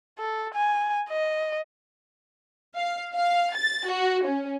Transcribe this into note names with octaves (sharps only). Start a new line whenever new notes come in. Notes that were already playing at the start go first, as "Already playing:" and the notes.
A4
G#5
D#5
F5
F5
A6
F#4
C#4